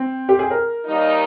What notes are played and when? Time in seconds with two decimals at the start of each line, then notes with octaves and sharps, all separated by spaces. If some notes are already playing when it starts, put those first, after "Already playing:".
Already playing: C4
0.29 G4
0.39 G#4
0.50 A#4
0.85 D#2 D#3 G3 A#3 D#4